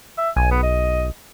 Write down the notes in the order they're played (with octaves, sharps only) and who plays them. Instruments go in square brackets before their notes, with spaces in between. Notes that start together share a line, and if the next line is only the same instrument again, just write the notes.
[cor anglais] E5
[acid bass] B1 [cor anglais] G#5
[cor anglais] B3
D#5